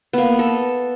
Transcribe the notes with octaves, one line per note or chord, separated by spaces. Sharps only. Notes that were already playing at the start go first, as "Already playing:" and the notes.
A#3 B3
A4